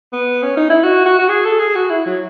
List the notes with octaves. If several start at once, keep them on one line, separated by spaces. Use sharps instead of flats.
B3
C#4
D#4
E4
F#4
F#4
F#4
G#4
A4
G#4
F#4
E4
F#3